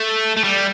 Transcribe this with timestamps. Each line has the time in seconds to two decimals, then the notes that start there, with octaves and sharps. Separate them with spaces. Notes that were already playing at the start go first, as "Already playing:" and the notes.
Already playing: A3
0.37 A3
0.44 G3